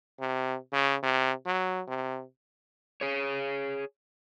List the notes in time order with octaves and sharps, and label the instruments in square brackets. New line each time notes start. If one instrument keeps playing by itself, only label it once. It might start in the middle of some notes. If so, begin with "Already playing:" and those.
[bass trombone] C3
C#3
C3
F#3
C3
[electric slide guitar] G#4 C#5